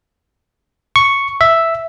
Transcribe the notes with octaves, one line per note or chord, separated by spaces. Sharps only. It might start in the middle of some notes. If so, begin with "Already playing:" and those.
C#6
E5